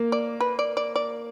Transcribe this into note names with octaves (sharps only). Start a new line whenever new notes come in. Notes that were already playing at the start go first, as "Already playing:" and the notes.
Already playing: A#3
D5
B4
D5
D5
D5